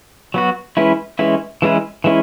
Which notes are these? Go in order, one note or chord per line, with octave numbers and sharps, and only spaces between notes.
F#3 B3 F#4
E3 G#3 C#4 E4 B4
E3 G#3 C#4 E4 B4
E3 G#3 C#4 E4 B4
E3 G#3 C#4 E4